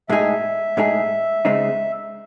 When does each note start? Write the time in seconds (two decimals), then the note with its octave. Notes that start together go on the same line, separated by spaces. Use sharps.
0.09 A2 G#3 D#4 G#4 E5
0.77 A2 G#3 D#4 G#4
1.45 C#3 G#3 C4 D#4